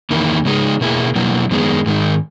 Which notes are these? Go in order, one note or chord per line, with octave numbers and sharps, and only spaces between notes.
E2 D#3 A#3 E4
C#3 G#3 D#4 G#4
B2 A#3 E4 G#4
B2 F#3 A#3 E4
F#2 D#3 G#3 B3
G#2 D#3 G#3 D#4